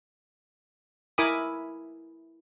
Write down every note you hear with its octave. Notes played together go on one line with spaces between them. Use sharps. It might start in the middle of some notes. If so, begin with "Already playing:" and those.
E4 A#4 G#5 B5 D6 D#6